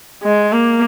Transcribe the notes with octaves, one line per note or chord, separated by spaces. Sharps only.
G#3
A#3